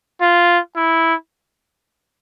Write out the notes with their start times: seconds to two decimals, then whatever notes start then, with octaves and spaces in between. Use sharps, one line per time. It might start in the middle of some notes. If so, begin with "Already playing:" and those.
0.21 F4
0.76 E4